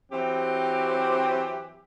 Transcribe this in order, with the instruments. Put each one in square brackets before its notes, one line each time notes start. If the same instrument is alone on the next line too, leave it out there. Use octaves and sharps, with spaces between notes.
[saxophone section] E3 F#3 G4 [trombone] C4